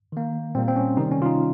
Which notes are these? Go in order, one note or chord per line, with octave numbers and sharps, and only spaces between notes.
D#3 A#3
A#2 G3 A#3 C4
C4
C#4
C3 D#3 G3 D#4
C#4
F4
D#4